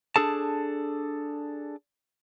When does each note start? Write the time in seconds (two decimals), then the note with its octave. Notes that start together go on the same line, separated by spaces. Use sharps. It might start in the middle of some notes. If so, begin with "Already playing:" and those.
0.16 D4 G#4 A4 A5